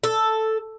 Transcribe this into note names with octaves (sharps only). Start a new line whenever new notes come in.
A4